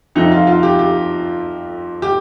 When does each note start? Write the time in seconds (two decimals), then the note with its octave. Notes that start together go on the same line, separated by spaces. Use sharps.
0.15 F2 C3 F3 D#4
0.32 F4
0.47 F4
0.63 G4
0.79 G4
2.02 G4